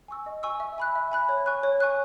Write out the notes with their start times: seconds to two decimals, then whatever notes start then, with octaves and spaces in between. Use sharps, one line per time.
0.08 G#5 C#6 E6
0.26 D#5
0.43 G#5 C#6 E6
0.60 E5
0.78 G#5 B5 F#6
0.95 E5
1.12 G#5 B5 F#6
1.29 C#5
1.46 G#5 C#6 F#6
1.63 C#5
1.80 G#5 C#6 F#6